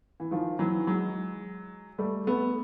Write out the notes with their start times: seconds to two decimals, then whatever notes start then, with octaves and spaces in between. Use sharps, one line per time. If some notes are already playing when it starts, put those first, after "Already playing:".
0.20 E3
0.31 D#3 F3
0.59 E3 F#3
0.87 F#3 G#3
1.98 G3 A3
2.27 A3 B3